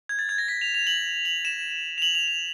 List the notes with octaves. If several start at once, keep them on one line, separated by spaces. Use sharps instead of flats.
G#6
A6
G#6
A#6
B6
F7
F7
F#7
F#7
E7
F7
F#7
F7
F7